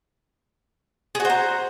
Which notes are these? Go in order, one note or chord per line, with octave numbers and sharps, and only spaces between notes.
F#4 G#4 C5 A#5